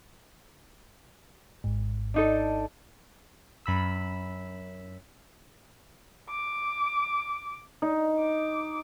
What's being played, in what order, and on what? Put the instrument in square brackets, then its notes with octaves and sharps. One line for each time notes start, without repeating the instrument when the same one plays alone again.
[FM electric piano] G#1 G#2
[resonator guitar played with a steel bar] D4 D#4 A4
[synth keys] F#2 B5 E6
[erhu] D6
[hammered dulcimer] D#4
[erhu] D6